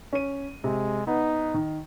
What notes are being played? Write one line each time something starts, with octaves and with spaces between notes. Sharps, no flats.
C#4 D#7
C3 G#3
B3 D#4
D#3